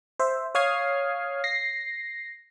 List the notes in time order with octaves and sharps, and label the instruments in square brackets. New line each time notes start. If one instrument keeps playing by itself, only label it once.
[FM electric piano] C5 E5
C#5 F5 D#6 F6 G#6 C7
A#6 C7